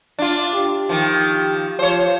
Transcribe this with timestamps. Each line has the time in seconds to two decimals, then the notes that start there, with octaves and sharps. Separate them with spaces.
0.19 D4 F4
0.55 G4
0.89 D#3 F3
1.79 F3 C5 C#5